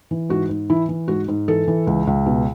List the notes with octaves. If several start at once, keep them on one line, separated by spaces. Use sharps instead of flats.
E3
G#2 F#4
G#2
E3 E4
E3
G#2 F#4
G#2
E3 A4
E3
C#2
C#2
B2